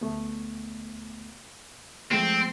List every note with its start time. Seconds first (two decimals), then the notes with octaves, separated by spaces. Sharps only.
0.01 D2 A3 B3
2.11 F3 G#3 A3 C4